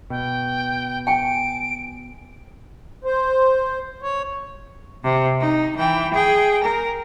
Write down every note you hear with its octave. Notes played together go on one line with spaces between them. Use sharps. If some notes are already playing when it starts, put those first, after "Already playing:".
B2 G5
G5 G#5 D7
C5
C#5
C3
D#4
E3 G5
G#4 G5
A#4